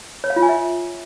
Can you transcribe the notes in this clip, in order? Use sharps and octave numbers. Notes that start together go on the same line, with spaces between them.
C#5
F5
F4
G#5
E5